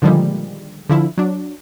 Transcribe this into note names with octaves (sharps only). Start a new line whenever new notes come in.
A#2 D3 D#3 F3 G3 G#3
D3 F3 E4
F#3 D4